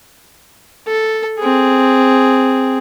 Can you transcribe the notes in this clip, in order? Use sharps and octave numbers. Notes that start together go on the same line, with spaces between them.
A4
C4 G#4